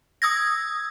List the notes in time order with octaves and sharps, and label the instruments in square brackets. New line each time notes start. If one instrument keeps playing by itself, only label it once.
[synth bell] D#6 E6 G#6 A#6